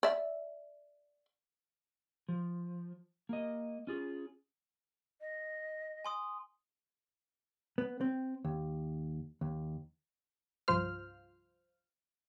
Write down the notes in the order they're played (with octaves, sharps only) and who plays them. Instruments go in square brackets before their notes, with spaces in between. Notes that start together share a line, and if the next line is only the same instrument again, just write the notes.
[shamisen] D5 E5
[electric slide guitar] F3
A#3 D#5
C#4 F4 G#4
[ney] D#5
[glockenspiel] G#5 C6 D#6
[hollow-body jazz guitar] B3
C4
D#2
D#2
[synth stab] C2 G2 F3 F4 C5 F6